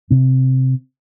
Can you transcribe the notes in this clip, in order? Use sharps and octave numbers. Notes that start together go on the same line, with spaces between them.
C3 C4